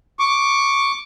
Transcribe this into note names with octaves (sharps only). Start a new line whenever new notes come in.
C#6 D6